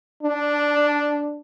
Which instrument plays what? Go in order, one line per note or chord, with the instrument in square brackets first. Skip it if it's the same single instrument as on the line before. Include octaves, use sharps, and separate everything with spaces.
[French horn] D4